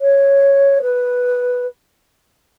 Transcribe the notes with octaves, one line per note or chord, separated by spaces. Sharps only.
C#5
B4